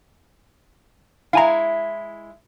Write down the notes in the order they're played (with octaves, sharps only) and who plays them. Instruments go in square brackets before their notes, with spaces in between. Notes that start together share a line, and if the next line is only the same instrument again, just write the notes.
[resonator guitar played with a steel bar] G#3 E4 [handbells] F5 G#5 A#5